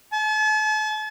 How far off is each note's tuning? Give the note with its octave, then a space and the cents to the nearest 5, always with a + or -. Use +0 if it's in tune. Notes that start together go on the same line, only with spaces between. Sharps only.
A5 -45